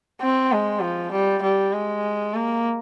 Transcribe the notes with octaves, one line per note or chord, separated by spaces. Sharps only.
C4
G#3
F3
G3
G3
G#3
A#3